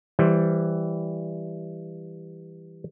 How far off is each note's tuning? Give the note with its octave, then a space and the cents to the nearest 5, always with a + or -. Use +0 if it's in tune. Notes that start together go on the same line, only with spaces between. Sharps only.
E3 +0 G3 +5 C5 +20